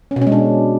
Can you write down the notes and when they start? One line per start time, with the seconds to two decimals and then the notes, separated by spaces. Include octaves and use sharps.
0.11 C#4
0.16 B2
0.21 C#4
0.27 G#3
0.32 D4